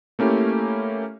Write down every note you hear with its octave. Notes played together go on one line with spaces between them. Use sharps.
A3 A#3 C#4 E4 G4